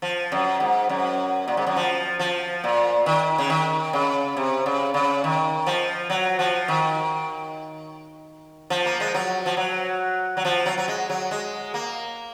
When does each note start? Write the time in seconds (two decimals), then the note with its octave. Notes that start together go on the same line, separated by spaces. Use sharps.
0.02 F3
0.32 F#2
0.60 G#2
0.89 F#2
1.48 A#2
1.57 G#2
1.67 F#2
1.76 F3
2.19 F3
2.64 A#2
3.06 D#3
3.38 C#3
3.50 D#3
3.93 C#3
4.37 C3
4.66 C#3
4.94 C#3
5.24 D#3
5.66 F3
6.10 F#3
6.39 F3
6.68 D#3
8.70 F3
8.86 A#3
9.00 G#3
9.14 F#3
9.46 F3
9.57 F#3
10.37 F#3
10.45 F3
10.66 F#3
10.77 F#3
10.88 G#3
11.10 F#3
11.31 G#3
11.74 A#3